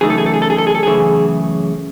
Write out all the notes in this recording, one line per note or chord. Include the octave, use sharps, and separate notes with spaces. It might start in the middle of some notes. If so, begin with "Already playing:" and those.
F#2 C#3 E3 A3 D#4 G#4
A4
G#4
A4
G#4
A4
G#4
A4
G#4
A4
F#2 C#3 E3 A3 G#4